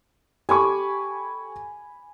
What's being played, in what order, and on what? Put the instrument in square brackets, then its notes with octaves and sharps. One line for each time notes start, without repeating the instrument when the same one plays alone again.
[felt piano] G4 A4 C#6 [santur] G#5 B5 D6